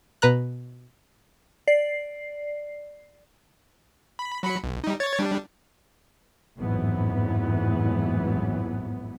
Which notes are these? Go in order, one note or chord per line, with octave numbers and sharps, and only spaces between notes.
B2 B4 A#5 F#6
D5 C7
B5
F#3 B5 C#7
B1
G3 D#4
C#5 G#6 A6
G3 D4
A1 F2 G#2 E3 F#3 B3